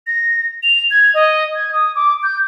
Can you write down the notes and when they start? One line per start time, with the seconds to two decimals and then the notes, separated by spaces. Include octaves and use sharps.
0.07 A#6
0.63 F7
0.91 G#6
1.14 D#5
1.55 G#6
1.73 D#6
1.96 D6
2.23 G6